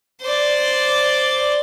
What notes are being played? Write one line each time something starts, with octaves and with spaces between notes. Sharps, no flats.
C5 D5